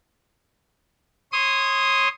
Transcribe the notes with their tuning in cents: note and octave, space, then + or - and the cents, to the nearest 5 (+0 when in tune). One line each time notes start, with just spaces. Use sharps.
C#5 -20 C6 -5 D#6 +0